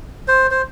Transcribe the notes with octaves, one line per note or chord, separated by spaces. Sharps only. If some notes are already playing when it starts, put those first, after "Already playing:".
C5
C5